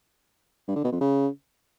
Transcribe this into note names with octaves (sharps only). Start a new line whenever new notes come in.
G2
D3
B2
F2
C#3